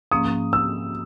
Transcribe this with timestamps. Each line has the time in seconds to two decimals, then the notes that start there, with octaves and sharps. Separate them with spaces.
0.11 G#2 F3 A#3 C#4 D#6
0.53 E6